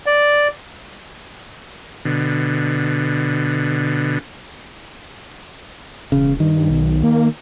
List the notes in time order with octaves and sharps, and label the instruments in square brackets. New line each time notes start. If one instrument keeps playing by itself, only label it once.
[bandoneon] D5
[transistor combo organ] B2 D3
[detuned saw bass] E1 [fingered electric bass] C#3
[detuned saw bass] G2 [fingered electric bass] D#3
[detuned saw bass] B1
A#3